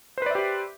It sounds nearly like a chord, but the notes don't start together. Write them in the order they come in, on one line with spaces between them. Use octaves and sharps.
C5 B4 D5 E5 G4